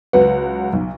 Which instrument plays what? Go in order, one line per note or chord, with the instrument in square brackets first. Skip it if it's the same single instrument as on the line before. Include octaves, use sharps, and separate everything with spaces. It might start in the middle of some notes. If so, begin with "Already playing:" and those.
[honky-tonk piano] C#2 F#3 F#5 [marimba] B4
[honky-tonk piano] B1